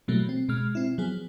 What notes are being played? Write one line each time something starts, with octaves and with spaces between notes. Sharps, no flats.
B2 E3 F#3 G3 A3 A#3
C4
B2 G#3 F6
C4 E4
F3 F#3 B3 G#4